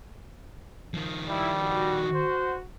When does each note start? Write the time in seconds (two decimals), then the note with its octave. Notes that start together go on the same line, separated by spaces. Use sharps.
0.94 D#3 F3
1.29 G3 E4
1.64 F#4
2.14 C5